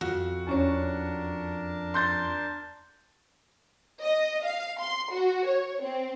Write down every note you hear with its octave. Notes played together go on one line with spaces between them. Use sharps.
F2 F#4
E2 C#4 D4 A#4 C#5 A5
C6 G6 A6
D#5
F5
C6
F#4
C#5
C4